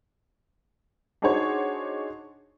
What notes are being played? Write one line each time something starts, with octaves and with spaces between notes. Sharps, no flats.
D4 D#4 F#4 G#4 C5 C#5